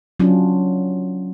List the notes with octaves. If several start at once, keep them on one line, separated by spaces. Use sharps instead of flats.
F#3 C#4 D4 F4